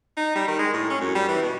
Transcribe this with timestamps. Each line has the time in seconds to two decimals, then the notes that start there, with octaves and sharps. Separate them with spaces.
0.17 D#4
0.35 G3
0.48 D#3
0.59 G#3
0.74 A2
0.90 C#4
1.01 F#2
1.15 G3
1.29 E3
1.42 B2